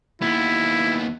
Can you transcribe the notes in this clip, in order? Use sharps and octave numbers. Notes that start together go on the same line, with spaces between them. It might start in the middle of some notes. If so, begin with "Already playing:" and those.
D#2 B3 E4